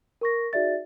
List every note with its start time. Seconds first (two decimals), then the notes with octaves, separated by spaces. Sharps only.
0.21 A#4 C#6 A#6
0.53 D#4 F#4 G#4 D5 E5 A6